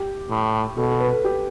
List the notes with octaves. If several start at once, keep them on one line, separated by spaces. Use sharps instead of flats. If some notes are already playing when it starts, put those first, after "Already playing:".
Already playing: G4
A2
B2 A4
A4
B4
A4
G4